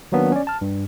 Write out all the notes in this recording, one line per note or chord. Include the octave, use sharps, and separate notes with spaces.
D#3 F#3 A#3 B3 D4
C#4 D5
A5 F6
G2